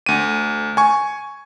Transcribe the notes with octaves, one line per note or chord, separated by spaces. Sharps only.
D2 D#7
G#5 C#6